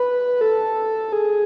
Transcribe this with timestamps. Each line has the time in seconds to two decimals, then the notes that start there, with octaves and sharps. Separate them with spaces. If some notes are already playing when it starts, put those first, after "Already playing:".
Already playing: B4
0.41 A4
1.13 G#4